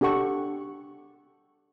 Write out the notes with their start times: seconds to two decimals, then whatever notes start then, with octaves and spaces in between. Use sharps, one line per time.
0.01 D4 G4 A4 F#5 C#6